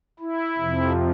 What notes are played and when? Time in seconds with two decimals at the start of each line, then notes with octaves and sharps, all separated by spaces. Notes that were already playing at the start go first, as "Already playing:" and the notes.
0.19 E4
0.58 F2 C3 F3